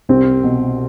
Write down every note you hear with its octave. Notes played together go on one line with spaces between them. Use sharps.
C2 C4
B2